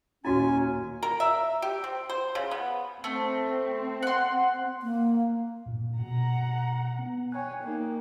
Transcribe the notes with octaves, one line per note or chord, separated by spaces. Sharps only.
D#2 A#2 C#4 E4 F#4 G#5
A#4
E5
G4
C4
C5
C#3
B3
A3 C4
F#5 C6
A#3
G2 A#2
B2 F#5 A#5
B3
C#5 G5 G#5 F#6
A#3 D#4